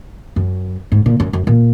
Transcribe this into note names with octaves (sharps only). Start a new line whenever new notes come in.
F#2
G#2
A#2
F#2
F#2
A#2